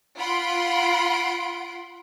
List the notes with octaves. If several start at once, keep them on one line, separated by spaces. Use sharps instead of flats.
F4 F#5 B5 C6 D7